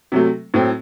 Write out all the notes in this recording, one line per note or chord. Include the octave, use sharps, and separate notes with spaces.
C3 F#3 A3
A2 F#3 A3 C4